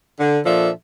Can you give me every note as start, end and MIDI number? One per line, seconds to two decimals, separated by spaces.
0.20 0.39 50
0.45 0.70 46
0.45 0.70 53
0.45 0.70 62
0.45 0.70 69
0.45 0.70 76